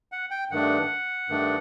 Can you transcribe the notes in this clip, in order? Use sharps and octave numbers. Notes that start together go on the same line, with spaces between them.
F#5
G5
G2 D#3 A3 D4 F#5
G2 D#3 A3 D4